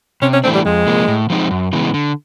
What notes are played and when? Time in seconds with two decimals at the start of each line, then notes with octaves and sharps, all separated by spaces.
0.22 C3 C#4
0.33 C#4
0.44 E3 A3 C4 D4
0.54 G3
0.65 F2 G#3
0.87 C3 F3 A#3
1.08 A2
1.30 F3 G#3 C4 D#4
1.51 F#2
1.73 C#3 E3 G#3 B3
1.94 D3